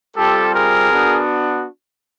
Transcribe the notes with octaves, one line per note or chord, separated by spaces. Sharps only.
G3 C4 F4 G4 A4
G#4 A#4
B3 D4 F#4